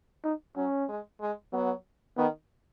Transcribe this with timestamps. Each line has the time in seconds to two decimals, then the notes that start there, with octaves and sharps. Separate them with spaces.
0.24 D#4
0.56 F#3 C#4
0.88 G#3
1.21 G#3
1.53 F#3 B3
2.17 D#3 B3